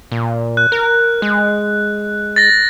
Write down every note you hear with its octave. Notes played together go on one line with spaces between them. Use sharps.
A#2
F#6
A#4
G#3
A6 A#6